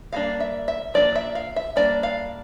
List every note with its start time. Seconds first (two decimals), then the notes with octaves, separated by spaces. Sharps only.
0.12 G3 A#3 D4 F5
0.40 E5
0.68 E5
0.94 F3 A#3 D4 D5
1.15 E5
1.35 F5
1.56 E5
1.76 G3 A#3 D4 D5
2.03 F5